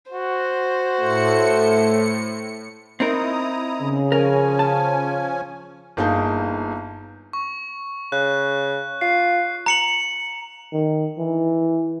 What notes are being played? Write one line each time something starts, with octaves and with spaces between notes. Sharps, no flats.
F#4 C5
A2 A3 C#7
C4 D#4 E4 A#4 A#5 D#6
C#3
F3 C#4 A#4 G#5
A5
G1 A#3 D#4 G#4 A5 G6
C#6
C#3 F#6
F4 C7
A#5 C#7 F#7
D#3
E3